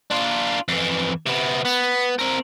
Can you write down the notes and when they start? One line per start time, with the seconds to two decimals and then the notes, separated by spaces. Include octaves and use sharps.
0.11 D4 F4
0.68 F2 E3
1.26 C3 B3
1.65 B3
2.19 C4 A#4